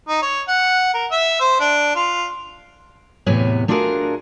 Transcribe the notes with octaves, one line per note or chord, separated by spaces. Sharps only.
D#4
C#5
F#5
A#4
E5
C5
D4
F4
E2 A2 C3 B3 C#5 G#5
A3 D4 F4 F#4 G#4 A#4